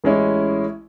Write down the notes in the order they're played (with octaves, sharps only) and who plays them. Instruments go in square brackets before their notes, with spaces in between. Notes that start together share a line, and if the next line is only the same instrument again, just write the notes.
[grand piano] A1 G#3 C#4 E4